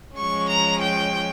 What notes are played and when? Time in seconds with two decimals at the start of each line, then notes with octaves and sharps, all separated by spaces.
0.17 F3 G#3 C#4 C#6
0.49 A#5
0.81 G5